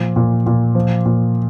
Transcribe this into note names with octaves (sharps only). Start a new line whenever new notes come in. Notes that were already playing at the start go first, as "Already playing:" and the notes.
Already playing: A#2 F3
A#2
A#2
F3
A#2